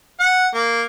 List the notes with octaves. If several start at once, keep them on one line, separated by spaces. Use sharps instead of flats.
F#5
A#3